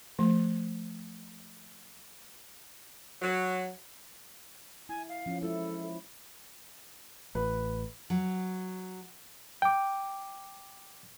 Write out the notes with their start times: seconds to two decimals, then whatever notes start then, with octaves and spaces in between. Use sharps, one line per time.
0.19 F3 A3
3.22 F#3
4.89 E4 G#5
5.09 F5
5.26 F3 C#4
5.42 G#3 C#4 E4 A4
7.35 A1 B4
8.10 F#3
9.62 G5 D6